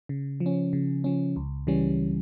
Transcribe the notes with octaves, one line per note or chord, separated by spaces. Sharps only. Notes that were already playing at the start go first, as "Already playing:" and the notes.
C#3
F3
C#4
C#3
F3 C#4
C#2
C#3 E3 G3 C#4